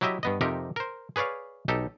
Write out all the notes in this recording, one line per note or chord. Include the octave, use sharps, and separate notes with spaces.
F#3 E4 G4 D#5 E5
G2 B3 D#5
F2 C3 D#4 G4 A#4
A#4 C5
G#4 B4 C#5 D5 F5
B1 D#4 G4 A4